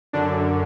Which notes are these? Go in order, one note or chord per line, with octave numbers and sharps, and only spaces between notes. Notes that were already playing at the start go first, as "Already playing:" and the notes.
F#2 D3 D4